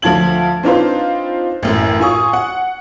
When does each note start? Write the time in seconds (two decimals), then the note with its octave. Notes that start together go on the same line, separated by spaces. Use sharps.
0.02 D2 F3 F4 A5 G#6 F#7
0.63 C4 D4 D#4 F4 B4 C5
1.63 A1 F#2 A2
2.00 F4 G#5 C#6 D#6
2.33 F#5